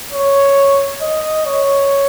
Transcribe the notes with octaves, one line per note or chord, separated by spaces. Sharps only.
C#5
D#5
C#5